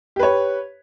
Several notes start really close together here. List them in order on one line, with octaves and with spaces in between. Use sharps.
G4 B4 C#5